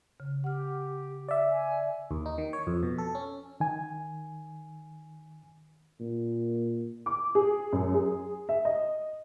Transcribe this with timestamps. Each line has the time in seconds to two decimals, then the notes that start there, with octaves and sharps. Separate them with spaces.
0.20 C#3
0.44 G4 F#5 F6
1.28 D5 E5
1.50 G#5
2.11 D#2
2.26 D#4
2.38 D#3
2.53 C#5
2.67 F2
2.83 B2
2.98 A4
3.15 C#4
3.60 D#3 G#5
6.00 A#2
7.06 D6
7.35 G#4
7.73 F#2
7.94 G#4
8.49 E5
8.65 D#5